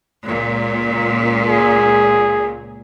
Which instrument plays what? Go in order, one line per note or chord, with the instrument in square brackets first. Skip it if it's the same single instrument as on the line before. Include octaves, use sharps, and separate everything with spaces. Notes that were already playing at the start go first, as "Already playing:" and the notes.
[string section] C#2 A#2
[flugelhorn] G#4